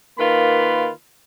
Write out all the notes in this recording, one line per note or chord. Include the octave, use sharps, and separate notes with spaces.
D#3 A#3 F4 B4 B5